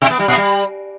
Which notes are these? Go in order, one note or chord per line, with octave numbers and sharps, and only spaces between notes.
B2
B3
G3
A#2
G3